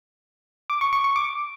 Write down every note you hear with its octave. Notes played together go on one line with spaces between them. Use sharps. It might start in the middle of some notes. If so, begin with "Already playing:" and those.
D6
C#6
C#6
C#6
D6